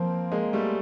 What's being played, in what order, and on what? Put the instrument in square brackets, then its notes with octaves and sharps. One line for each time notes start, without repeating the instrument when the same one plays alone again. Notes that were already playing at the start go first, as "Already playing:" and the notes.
Already playing: [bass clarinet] F3 [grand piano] A#3 C4
[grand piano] G#3 A#3
G3 A3